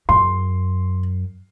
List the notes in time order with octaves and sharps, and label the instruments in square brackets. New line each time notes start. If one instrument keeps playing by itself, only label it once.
[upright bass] F#2 [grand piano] C6